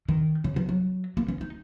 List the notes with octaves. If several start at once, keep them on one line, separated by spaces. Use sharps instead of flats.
D#3
C#3
F3
F#3
A#3
C#4
D#4